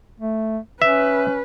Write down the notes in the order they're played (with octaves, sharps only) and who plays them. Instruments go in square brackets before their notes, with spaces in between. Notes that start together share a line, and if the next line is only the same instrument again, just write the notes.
[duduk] A3
[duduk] C#4 [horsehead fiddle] B4 [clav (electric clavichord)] E5